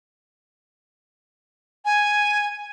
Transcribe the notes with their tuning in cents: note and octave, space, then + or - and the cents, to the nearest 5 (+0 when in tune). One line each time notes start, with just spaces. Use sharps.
G#5 +0